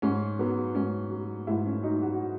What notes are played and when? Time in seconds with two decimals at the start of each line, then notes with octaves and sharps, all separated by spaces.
0.02 G#2 C#4
0.39 F#3 B3
0.75 G#2 C#4
1.11 F#3
1.47 G#2 E4
1.66 C#4
1.83 F#3 D#4
2.02 F#4